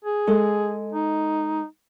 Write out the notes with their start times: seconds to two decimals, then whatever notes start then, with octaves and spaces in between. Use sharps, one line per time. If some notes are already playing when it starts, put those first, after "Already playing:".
0.05 G#4
0.27 G#3 A4 G#5
0.93 D#4